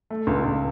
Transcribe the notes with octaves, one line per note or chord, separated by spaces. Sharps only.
A3
C#2
C#2